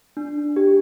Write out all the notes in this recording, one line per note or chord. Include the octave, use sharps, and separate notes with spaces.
D4
G4